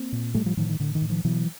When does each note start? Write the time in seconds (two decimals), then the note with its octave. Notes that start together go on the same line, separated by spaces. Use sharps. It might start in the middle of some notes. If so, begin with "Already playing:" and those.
Already playing: A#3 C4
0.12 A#2
0.34 A2 G3 A3
0.46 F3 G3
0.57 A2 D#3 F3
0.69 D#3
0.79 A2 D3
0.95 D#3
1.02 A2
1.09 D#3 F3
1.24 B2 E3 F#3